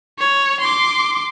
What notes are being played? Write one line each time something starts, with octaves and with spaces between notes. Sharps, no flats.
C#5
C6 D6